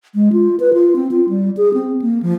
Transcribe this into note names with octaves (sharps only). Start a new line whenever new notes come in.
G#3
F4
B4
F4
C4
F4
G3
G#4
C4
A#3
F3